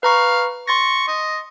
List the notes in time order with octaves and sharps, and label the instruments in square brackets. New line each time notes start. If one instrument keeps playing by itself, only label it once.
[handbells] B4 A#5 C#6 [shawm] F5
[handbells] C6 A6 A#6 [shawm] C#6
[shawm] D#5